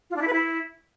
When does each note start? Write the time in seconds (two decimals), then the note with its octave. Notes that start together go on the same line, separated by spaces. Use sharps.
0.10 F4
0.16 D4
0.22 E4
0.27 B4
0.33 E4